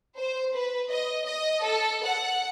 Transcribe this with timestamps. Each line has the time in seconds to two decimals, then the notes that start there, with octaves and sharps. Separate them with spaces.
0.17 C5
0.55 B4
0.90 D#5
1.25 D#5
1.63 A4
2.04 F#5